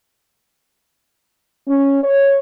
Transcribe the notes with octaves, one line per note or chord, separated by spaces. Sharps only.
C#4
C#5